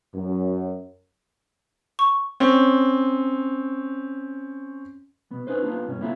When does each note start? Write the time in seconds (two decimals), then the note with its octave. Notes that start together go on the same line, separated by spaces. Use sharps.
0.14 F#2
1.99 C#6
2.40 C4 C#4
5.31 B2 B3
5.47 C#4 D#4 B4 C5
5.62 A#3 B3 D4 F4
5.86 C#2 G2 B2 C#4
6.01 A#3 B3 E4 F4 G#4 A4